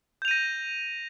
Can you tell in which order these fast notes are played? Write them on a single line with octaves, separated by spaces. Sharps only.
G6 F7 D#7 A#6